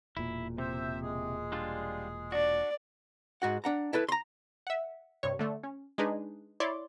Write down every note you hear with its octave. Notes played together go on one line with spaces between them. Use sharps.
E1 A#2 E4
C3 C5 E5
G#3 G#4
G3 D4 F4
D4 F#4 D5
G#2 F#4 F#5
D4 F#5 A#5
E4 A4 B4
A#5 C6
E5 F#5
G2 C3 C#5
D3 A3
C#4
G#3 D4 D#4 G#4 B4
E4 C#5 D5 C6 D6